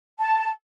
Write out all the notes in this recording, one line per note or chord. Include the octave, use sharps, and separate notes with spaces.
A5